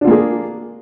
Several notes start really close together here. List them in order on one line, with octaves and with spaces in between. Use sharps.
D4 F4 A#3 G#4